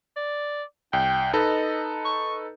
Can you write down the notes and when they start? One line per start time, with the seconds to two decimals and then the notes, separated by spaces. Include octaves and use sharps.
0.17 D5
0.93 C2 G5
1.33 D#4 A4 B4 D#5
2.05 C#6